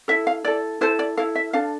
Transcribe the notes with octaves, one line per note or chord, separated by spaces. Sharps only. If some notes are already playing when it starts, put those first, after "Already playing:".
E4 A4 E5
F5
E4 A4 D5
E4 A4 C5
D5
E4 A4 F5
E5
D4 A4 F5